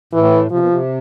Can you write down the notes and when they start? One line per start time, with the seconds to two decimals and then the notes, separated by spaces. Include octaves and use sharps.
0.13 A2 E3
0.51 C3 F3
0.59 B2
0.69 C3